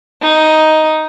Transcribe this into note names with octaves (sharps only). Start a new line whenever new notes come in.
D#4